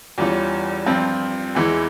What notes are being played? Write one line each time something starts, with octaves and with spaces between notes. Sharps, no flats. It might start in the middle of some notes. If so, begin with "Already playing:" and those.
E2 E3 G3 C#4 F4
G2 F3 C4 F4
E2 E3 G#3 E4